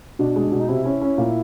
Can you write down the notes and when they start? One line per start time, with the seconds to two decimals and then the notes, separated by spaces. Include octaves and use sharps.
0.19 B2 D4
0.36 G#3
0.52 B2
0.61 D#4
0.68 C3 E4
0.85 C#4
1.01 C#4
1.18 A#2